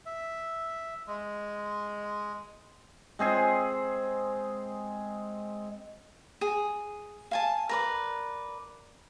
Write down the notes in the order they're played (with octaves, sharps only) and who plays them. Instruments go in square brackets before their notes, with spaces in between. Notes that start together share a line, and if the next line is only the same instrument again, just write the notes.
[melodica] E5
G#3
[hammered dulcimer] G#3 C4 G#4 G#5
[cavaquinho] G#4
F5 G#5 A5
A#4 B4 D5